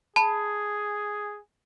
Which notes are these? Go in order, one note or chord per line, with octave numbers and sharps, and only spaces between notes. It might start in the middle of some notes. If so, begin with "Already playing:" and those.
G#4 A5 B5